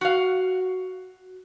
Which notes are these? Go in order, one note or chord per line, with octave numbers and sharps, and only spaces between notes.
F#4 F5